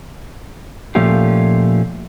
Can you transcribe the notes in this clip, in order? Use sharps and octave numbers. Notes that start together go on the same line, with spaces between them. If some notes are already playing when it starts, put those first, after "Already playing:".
A#2 F3 A3 C#4 F4 G4